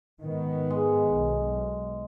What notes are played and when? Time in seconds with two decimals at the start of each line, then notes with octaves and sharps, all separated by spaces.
0.22 G#2 D#3 B3
0.70 G#3
1.12 B1